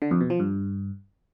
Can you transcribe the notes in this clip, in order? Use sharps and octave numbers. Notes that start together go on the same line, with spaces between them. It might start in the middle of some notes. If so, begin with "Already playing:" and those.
D3
F2
B2
F3
G2